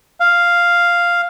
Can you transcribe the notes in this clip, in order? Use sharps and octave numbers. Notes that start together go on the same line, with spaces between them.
F5